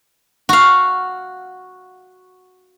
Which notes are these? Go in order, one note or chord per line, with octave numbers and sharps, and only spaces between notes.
F#4 F5